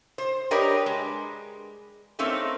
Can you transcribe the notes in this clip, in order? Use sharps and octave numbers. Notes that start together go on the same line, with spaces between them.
C5
D4 G4 A#4 B4 C#5 D#5
G#3
A3 A#3 C4 C#4 D#4